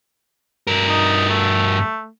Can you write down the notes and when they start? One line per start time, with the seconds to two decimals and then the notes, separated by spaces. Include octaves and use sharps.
0.67 G2 A#4
0.89 D#4
1.30 A3